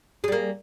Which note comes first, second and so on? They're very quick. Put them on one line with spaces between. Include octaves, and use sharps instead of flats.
G#4 G3 A#3